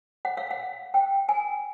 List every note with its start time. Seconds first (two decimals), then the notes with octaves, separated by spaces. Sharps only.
0.25 F#5
0.37 F5
0.51 F#5
0.94 G5
1.29 G#5